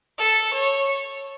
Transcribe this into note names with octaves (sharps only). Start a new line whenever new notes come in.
A4
C#5